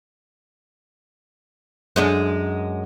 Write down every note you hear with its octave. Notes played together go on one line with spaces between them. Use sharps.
F#2 G#3 D4